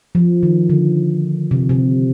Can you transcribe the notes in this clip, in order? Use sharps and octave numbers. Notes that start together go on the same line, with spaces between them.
F3
D#3
D3
C3
C3